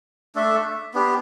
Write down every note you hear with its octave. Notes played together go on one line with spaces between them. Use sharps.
A3 D4 A4 E5
B3 D4 G4